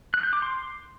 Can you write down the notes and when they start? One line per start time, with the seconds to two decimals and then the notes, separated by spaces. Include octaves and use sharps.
0.14 F#6
0.23 G6
0.33 D6
0.42 C6